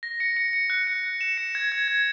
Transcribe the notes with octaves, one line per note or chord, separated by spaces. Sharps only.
A#6
C#7
C#7
C#7
F#6
C#7
C#7
E7
C#7
G#6
G#6
G#6